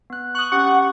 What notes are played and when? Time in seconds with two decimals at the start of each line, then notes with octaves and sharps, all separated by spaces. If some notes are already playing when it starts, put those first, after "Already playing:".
0.10 B3 F#6
0.35 C#6 D#6 F#6
0.52 C#4 G4 F#5 C#6